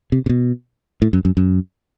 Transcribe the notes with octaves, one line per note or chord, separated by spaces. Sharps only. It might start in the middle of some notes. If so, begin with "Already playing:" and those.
C3
C3
B2
A2
F#2
F#2
F#2